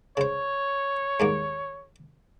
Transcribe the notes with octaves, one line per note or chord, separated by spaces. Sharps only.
C#3 C5 C#5
D#2 G#2 A#3